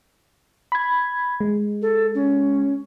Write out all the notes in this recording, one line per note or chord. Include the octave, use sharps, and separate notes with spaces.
B5 G#6
G#3
A4
C#4